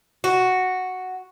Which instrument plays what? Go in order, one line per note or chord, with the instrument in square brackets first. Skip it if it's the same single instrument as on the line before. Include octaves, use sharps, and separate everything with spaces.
[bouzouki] F#4